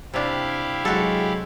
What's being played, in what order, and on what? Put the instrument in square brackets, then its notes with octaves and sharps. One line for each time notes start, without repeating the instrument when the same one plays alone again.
[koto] C3 D4 [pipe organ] E4 G4 F5
[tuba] F#3 [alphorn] G#3 [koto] F#4 A4